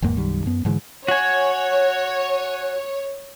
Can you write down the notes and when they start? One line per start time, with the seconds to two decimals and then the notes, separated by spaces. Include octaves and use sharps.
0.02 G1 E2 G#2 A#3
0.17 B1 F#2 D#3 G3
0.46 F#2 B3
0.65 G#2 D3 E3 G#3
1.08 F#4 C#5 G#5